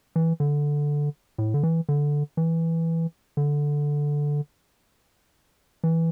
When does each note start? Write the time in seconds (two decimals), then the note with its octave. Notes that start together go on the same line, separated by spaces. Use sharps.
0.16 E3
0.40 D3
1.38 A2
1.54 D3
1.63 E3
1.89 D3
2.37 E3
3.37 D3
5.84 E3